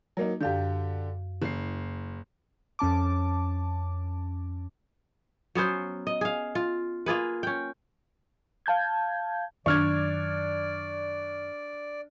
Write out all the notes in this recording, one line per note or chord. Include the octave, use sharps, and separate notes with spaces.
F#3 A#3 D#4
F#2 D3 G4 F5 G6
F#1 C7
F2 C#4 A5 D6
F#3 B3 C#4 C5
D#5
G#4 F5
F4
A#3 F4 G#4 B4
C#4 G5
F5 A5 G6 G#6
F#2 D#3 D4 D5 C#6 F6 G#6